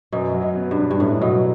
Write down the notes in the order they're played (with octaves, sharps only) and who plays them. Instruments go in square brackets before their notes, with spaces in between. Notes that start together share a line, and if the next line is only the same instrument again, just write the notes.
[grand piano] F#2 [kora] B2
[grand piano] F#3
[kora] B2
[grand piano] B3
[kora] G2
[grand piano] D4
[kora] G2
[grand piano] F#2 [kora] A2
[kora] B2 [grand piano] F#3